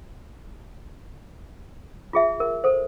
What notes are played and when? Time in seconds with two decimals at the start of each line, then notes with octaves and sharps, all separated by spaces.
2.13 F4 G#4 E5
2.40 A#4
2.64 A4 C5